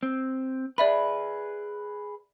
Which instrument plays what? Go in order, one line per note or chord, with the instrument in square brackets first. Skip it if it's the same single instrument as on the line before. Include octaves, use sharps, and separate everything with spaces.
[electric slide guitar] C4
[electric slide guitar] G#4 B4 [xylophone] D5 E5 B5